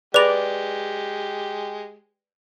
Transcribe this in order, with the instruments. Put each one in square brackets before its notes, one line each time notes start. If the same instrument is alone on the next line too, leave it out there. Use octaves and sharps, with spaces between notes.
[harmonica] G#3 G4 [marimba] G#4 B5 A#6 [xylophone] B4 F7 [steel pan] D5